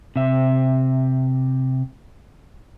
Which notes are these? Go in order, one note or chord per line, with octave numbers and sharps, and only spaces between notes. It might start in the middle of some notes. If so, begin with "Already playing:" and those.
C3 E5